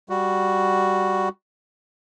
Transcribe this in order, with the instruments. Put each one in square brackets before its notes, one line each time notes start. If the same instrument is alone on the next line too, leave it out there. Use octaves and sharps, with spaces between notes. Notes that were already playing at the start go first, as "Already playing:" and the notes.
[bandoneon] G3 F#4